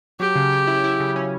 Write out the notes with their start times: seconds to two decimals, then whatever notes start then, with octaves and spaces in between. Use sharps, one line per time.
0.20 F#3 G4
0.36 C#3
0.52 C#3
0.67 E4
0.84 E4
1.00 C#3
1.16 C#4